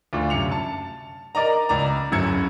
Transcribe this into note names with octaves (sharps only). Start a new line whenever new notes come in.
D2 D4 F4
F#2 C3 C#7 F7
A5
A#4 D5 D#5 A#5
C#2 D5 A#5
D1 F#2 E6 G#6 C#7